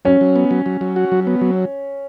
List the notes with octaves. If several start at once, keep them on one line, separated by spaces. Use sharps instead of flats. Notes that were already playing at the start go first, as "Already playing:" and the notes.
F#3 C#4
F#3
B3
F#3
F#3
F#3
F#4
F#3
B3
F#3